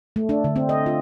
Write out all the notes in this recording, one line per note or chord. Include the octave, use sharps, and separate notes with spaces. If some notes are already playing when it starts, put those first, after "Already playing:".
A3
D4
D3
C4
D#5
F4